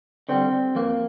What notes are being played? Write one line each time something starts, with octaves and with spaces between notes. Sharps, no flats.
D3 G3 C4
F2 A#3